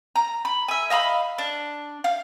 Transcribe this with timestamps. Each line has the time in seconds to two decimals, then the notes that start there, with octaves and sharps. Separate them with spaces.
0.16 A#5
0.45 B5
0.68 E5 G#5
0.90 D#5 F5 A#5 B5
1.38 D4
2.04 F5